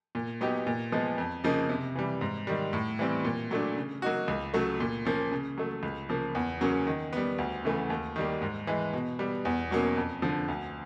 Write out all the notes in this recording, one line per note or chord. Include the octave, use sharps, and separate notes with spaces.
A#2
F#3 B3 D#4 G4
A#2
F3 G#3 B3
F2
C#3 F3 A#3 D#4
C3
E3 G3
G#2
D#3 G3
A2
E3 G3 C4
A#2
F#3 A3 D4
C#3
F#3 A#3 D#4 F#4
C#2
C#3 F#3 A3
A#2
F3 A#3 C#4
C#3
F#3 A3
C#2
C#3 F3 A#3
E2
C#3 F#3 A#3 C#4
D#3
G3 B3
D2
C#3 E3 A3
D#2
D#3 G3 A#3
G#2
E3 G#3
B2
G3 B3
E2
B2 F#3 A#3 C#4
F2
D3 F3
D2